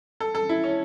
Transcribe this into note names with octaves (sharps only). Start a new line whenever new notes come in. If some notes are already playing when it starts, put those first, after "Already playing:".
A4
A4
E4
C#4